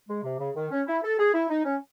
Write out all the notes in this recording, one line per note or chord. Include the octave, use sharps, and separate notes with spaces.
G#3
C3
C#3
D#3
C#4
E4
A4
G#4
E4
D#4
C#4